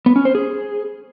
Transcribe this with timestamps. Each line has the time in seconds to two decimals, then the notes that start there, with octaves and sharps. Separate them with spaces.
0.06 B3
0.16 C#4
0.25 C5
0.35 G#4